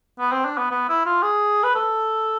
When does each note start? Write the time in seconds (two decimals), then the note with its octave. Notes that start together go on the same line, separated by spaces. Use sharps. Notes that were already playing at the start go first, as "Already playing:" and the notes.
0.19 B3
0.32 C4
0.45 D4
0.58 B3
0.71 B3
0.88 E4
1.06 F4
1.23 G#4
1.63 B4
1.75 A4